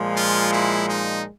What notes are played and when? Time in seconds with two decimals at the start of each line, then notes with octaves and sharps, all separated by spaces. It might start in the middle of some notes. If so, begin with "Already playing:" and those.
Already playing: A#2 F3 G#3
0.14 F4
0.51 E4
0.89 D#4